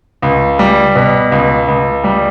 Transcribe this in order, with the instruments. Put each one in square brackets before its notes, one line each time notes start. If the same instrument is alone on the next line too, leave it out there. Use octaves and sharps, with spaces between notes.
[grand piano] C#2
G3
B2
C#2
C#2
G3